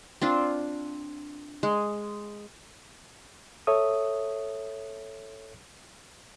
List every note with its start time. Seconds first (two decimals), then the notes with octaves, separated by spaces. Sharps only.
0.22 C4 D4 F4
1.63 G#3
3.67 A4 C#5 E5 D#6